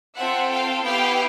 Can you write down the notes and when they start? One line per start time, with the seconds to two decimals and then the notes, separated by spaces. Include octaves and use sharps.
0.17 C4 F4 A4 E5 F#5
0.52 F5 G5
0.85 B3 E4 G4 F5 G5